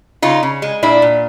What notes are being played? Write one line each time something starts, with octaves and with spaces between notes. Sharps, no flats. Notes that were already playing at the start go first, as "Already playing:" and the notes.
C#3 D#4 F4
C#3
G#3
A#2 D4 E4
A#2